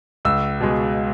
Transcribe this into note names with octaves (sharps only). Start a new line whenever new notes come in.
C#2 E6
B2 G#3